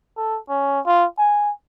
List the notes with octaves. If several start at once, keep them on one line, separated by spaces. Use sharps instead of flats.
A4
C#4
F4
G#5